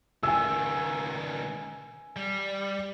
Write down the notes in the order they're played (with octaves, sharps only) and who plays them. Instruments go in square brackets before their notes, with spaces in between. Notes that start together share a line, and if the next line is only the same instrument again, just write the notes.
[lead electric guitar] C#2 D#3 [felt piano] G#5 E6
[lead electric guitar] G3